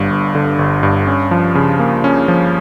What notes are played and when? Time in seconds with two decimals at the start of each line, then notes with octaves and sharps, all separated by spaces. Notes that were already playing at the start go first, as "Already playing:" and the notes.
Already playing: G1 G2
0.10 G1
0.35 D3
0.59 G1
0.83 G2
1.07 C#4
1.31 F3
1.55 C#3
1.79 A#3
2.04 C#4
2.28 F3